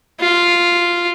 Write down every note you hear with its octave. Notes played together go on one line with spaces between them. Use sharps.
F4